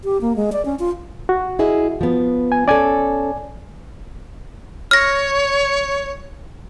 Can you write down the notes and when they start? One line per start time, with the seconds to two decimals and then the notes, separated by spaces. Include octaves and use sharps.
0.04 G4
0.21 A#3
0.36 G#3
0.52 D5
0.65 C#4
0.79 F4
1.29 F#4
1.59 E4 G#4 D#5
2.01 F3 B3
2.52 G#5
2.68 C#4 A4 D5 G#5
4.91 C#5 F6 A#6